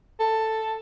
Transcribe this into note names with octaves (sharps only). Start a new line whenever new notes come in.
A4